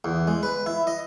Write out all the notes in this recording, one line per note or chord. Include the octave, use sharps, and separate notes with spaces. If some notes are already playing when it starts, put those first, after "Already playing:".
E2
G#3
B4
E4
D#5